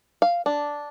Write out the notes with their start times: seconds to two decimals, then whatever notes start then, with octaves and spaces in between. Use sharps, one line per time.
0.22 F5
0.46 D4